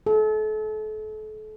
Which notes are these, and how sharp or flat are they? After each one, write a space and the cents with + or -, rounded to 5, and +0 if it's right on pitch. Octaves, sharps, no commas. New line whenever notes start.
A4 -35